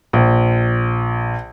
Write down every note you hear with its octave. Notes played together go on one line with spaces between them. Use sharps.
A#1